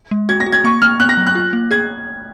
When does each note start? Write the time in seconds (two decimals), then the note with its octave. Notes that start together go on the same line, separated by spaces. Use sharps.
0.11 G#3
0.29 F#4 G#6
0.40 A#6
0.46 F#4
0.52 G#6
0.64 A#3 C#6
0.82 A#3 F6
1.00 B3 F#6
1.09 A#6
1.17 F#3
1.26 F#6
1.35 F4
1.53 A#3
1.71 G#4 G#6